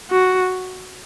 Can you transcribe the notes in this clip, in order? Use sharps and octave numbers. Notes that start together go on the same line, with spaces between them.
F#4